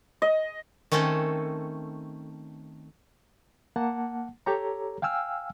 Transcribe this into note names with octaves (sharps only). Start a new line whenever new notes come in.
D#5
D#3 A3 C4 C#4 A4
A#3 F#5 A5
G4 A4 C#5 A#5
F5 G5 G#5 E6 F6